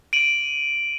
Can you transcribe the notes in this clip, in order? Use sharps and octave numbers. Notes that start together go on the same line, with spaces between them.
D7 D#7 F#7